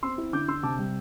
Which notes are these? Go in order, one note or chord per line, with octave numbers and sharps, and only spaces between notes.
C4 C6 E6
E4
D3 D6 G6
D3 C6 E6
C3 A5 D6
G3